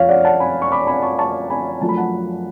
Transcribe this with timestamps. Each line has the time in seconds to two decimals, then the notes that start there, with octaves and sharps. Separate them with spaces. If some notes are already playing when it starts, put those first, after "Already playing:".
Already playing: F#1 F2 F3 C#5 F5
0.09 D5 F#5
0.25 F#5 A5
0.40 G#5 B5
0.62 C#6
0.72 B5 D6
0.87 G#5 B5
1.02 A5 C#6
1.19 A5 C#6
1.50 G#5 B5
1.81 F#2 F3 A3 A5
1.89 B5
1.97 F#5 A5